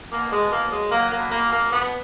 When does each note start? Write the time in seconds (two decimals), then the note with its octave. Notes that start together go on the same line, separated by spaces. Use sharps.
0.11 B2 A#3
0.31 G#3
0.38 B2
0.51 A#3
0.64 F#3
0.71 G#3
0.91 F#3 A#3
1.11 A#3
1.18 B2
1.31 A#3
1.45 B2
1.51 A#3
1.71 B2 B3